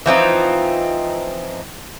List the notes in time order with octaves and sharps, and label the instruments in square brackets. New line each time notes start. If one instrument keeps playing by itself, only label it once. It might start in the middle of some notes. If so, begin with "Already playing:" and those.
[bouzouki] E3 F3 C4 D#4